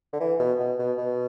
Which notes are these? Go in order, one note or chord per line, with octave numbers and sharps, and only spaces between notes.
D3
E3
B2
B2
B2
B2